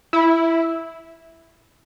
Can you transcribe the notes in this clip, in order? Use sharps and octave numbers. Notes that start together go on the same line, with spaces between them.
E4